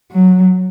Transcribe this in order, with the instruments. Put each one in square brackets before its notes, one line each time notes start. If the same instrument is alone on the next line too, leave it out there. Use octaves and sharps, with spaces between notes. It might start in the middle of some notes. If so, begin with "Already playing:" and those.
[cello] F#3